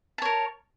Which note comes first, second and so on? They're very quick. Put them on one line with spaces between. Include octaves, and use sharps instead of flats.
A5 C#5 A#4